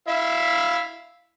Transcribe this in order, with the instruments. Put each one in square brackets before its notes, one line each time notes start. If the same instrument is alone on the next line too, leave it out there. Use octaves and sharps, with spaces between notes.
[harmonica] E4 E5 F5